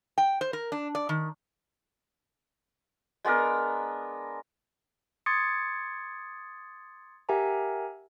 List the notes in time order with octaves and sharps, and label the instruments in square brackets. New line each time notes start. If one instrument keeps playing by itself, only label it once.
[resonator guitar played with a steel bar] G5
C5
A#4
D4
D5
D#3
[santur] G#3 B3 D4 A#4
[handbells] C6 D6 D#6 G#6 A6 C#7
G4 A#4 E5 F#5 G#5 A#5